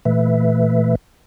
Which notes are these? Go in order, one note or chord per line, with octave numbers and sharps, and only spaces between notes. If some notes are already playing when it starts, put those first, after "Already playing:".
A#2 E3 A3 B4 E5